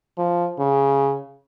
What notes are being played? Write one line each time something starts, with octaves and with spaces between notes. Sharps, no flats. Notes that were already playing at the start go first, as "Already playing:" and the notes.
F3
C#3